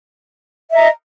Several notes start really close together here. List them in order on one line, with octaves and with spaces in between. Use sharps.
E5 D#5 A#5